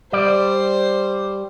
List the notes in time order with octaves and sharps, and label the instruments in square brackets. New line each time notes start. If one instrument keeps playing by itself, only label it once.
[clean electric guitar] G3 D5 [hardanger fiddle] C5